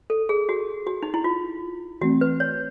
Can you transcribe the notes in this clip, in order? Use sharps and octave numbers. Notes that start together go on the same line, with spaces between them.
A4
G#4
F#4
F#4
D#4
E4
F4
E3 A3 C4 F#4
B4
C#5